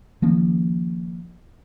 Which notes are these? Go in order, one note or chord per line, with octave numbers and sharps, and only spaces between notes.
D#3 F3 A#3 C#4